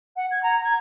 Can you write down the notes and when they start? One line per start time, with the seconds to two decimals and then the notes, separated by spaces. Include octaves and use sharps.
0.16 F#5
0.31 G#6
0.43 A#5
0.63 G#6